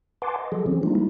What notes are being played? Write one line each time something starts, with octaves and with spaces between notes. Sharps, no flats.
B4 F#5 G#5 A5 C6 D6
D#5
F3 F#3 G#4 A4
E3 F3 C4 C#4
G3 G#3 A#3 D4 D#4 F4
G3 A#3 D#4 E4